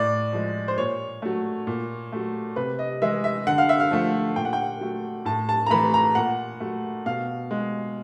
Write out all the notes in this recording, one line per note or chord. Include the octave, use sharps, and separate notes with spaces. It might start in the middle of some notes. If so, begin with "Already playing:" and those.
Already playing: A2 D5
F3 G#3
C5
A#2 C#5
F#3 A3
A#2
F#3 A3
C3 B4
D#5
E3 G#3 E5
E5
D3 F#5
F5
E5
F5
F3 A3
A#2 G5
F#5
G5
F#3 A3
A2 A5
A5
A#5
E3 A3 B5
A#5
A#2 F#5
F#3 A3
B2 F5
G#3